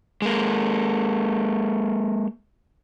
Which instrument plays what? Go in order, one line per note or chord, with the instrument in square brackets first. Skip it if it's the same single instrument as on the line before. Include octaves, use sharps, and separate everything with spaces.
[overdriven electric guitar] G#3 A#3